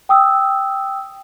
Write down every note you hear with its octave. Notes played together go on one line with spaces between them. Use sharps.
G5 D#6 E6